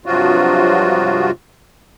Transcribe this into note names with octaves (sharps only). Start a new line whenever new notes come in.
G2 C3 F3 F#3 F4 F#4